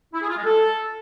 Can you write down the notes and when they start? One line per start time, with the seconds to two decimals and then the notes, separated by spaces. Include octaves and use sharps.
0.13 E4
0.21 G#4
0.29 F4
0.37 G#3
0.45 A4